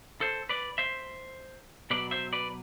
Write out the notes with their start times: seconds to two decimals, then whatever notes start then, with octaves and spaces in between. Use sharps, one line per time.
0.21 A4 C5
0.49 B4 D5
0.78 C5 E5
1.90 B2 F#3 B4 D5
2.11 C5 E5
2.33 B4 D5